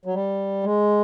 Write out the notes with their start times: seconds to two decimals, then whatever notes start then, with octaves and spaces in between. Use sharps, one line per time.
0.05 F#3
0.14 G3
0.64 G#3